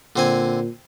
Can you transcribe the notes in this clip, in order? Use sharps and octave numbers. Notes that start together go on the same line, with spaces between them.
A#2 D3 C4 G#5